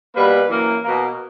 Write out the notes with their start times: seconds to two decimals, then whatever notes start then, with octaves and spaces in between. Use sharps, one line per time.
0.16 B2 G3 A#3 B4
0.49 F#2 E3 A#3
0.83 B2 A#3